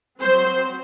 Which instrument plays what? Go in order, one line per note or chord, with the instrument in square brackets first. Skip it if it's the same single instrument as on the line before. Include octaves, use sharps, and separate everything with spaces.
[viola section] F#3 C4 C5